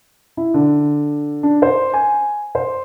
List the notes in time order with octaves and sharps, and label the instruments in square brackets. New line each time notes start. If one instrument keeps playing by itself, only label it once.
[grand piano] E4
D3
D4
C5
G#5
C5